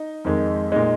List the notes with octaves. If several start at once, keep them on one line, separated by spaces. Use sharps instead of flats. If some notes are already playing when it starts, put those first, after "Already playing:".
Already playing: D#4
F2 D#3 G#3
A#2 G#3 D#4